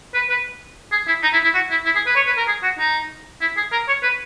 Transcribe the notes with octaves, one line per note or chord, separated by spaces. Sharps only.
B4
B4
G#4
E4
D#4
E4
E4
F#4
E4
E4
G#4
B4
C#5
B4
A#4
G#4
F#4
D#4
E4
G#4
A#4
C#5
B4